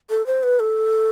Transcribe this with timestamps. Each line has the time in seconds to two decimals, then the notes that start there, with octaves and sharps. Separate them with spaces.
0.10 A4
0.26 C5
0.43 B4
0.59 A4